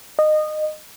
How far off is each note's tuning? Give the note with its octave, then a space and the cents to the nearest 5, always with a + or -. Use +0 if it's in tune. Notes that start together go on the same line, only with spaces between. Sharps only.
D#5 -20